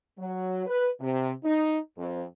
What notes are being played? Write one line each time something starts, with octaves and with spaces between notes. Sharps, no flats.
F#3
B4
C3
D#4
F2